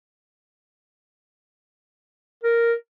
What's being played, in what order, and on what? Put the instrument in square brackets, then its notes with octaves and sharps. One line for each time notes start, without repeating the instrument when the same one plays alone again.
[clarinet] A#4